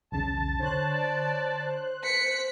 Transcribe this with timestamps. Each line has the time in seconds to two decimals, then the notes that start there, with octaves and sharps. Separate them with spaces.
0.12 B1 E2 C#3 A5
0.59 D3 C5 C#5 F#6
0.89 D5
2.04 B6 C#7